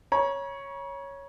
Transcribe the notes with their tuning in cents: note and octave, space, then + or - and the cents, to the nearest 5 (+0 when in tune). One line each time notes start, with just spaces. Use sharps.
C#5 +0 A#5 +45